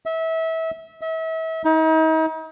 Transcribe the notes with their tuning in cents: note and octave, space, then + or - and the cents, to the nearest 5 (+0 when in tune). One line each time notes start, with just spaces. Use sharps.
E5 -25
E5 -35
D#4 +40